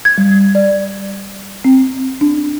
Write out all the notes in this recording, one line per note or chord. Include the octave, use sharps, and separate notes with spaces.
G#6
G3
D5
C4
D4